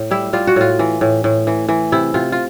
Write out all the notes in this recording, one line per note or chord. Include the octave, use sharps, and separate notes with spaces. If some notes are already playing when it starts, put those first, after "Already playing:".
Already playing: A2
G3 E4
G3 F4
F#4
A2 F4
E3
A2
A2
E3
E3
C3 E4
C3 F4
F4